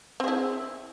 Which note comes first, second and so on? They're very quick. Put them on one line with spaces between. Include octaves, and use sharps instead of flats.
C4 G#4 E4